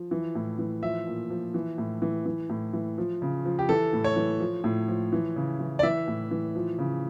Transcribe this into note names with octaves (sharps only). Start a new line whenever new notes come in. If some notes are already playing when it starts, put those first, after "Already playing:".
Already playing: F3
E3
A2
E3
F3 E5
A#2
F3
E3
A2
E3
E3
A2
E3
F3
C#3
F3
G4
E3 A4
A2
C#5
E3
F3
A2
F3
E3
C#3
E3
D5
E3 E5
A2
E3
F3
C#3